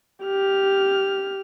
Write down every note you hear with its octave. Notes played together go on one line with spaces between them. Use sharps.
G4 F6